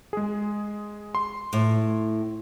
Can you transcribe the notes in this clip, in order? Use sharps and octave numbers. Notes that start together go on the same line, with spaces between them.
G#3 G#4
C6
A2